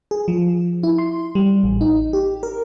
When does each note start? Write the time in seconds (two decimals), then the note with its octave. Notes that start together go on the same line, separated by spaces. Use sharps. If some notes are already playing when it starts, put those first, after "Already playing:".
0.11 G#4
0.28 F3
0.83 E4
0.98 C6
1.35 G3
1.63 A1
1.81 D#4
2.13 G4
2.43 A#4